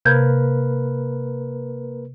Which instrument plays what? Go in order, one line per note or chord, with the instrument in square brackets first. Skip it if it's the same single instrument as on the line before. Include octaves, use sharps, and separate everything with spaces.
[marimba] C3 G6 G#6 [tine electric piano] A#3 A#4 B4